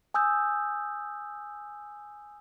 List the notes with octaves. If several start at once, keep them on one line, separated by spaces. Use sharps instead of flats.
G#5 D#6 E6 G6